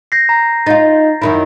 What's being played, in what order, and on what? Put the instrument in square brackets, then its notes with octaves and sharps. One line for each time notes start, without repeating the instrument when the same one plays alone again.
[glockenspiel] G6 A#6 C7
A#5
[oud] D#4 F4 [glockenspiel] A6
[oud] F#2 D#3 E4